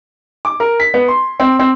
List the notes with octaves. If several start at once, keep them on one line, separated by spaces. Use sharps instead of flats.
D6
A#4
B6
B3
C6
C4
C4